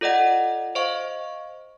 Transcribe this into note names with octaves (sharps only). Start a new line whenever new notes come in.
F4 A4 D5 D#5 F#5
C5 D#5 F5 C#6